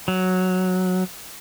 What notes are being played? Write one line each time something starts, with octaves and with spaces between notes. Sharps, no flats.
F#3